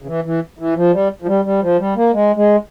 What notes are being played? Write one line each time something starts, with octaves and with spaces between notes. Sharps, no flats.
C#3
E3
E3
E3
F3
G3
F3
G3
G3
F3
G3
A#3
G#3
G#3